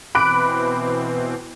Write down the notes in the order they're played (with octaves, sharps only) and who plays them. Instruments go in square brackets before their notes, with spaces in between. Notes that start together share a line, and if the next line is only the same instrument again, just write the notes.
[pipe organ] B2 E3 C4 [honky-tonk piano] B5 F#6 D7 [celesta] D6